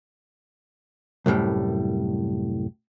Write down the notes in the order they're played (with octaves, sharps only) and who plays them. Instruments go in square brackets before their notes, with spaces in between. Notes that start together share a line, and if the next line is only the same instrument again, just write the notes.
[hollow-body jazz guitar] C2 F#2 A2 G3